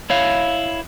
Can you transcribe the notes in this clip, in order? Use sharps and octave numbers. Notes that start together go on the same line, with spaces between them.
E4 C#5 F5